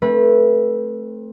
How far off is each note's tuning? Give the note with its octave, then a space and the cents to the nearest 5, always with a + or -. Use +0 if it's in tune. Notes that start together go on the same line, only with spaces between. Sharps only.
A3 +0 C4 +20 B4 -25